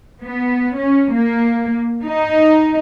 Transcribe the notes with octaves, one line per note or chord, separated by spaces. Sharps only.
B3
C#4
A#3
D#4